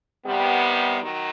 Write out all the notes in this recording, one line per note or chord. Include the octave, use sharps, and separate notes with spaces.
C3 D#3 G3 B3
D#3 F#3